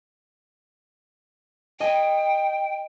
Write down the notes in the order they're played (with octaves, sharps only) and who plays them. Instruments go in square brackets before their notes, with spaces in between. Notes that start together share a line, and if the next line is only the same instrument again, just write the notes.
[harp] D#5 G#5 [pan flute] G5